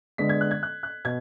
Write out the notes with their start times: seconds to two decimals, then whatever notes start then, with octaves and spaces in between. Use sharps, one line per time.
0.18 D3 G#3 B3 D4 B6
0.29 G#6
0.41 F#6
0.51 G#6
0.63 F#6
0.83 F#6
1.05 B2 G#6